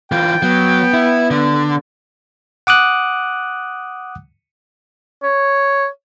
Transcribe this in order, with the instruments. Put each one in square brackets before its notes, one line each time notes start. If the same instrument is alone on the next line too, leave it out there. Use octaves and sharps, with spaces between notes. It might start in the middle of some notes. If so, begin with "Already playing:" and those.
[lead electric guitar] E3 F4 [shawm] G5
[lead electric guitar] F#3 [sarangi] B3
[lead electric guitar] E4
D3
[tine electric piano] F#5 D6 D#6 F#6
[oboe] C#5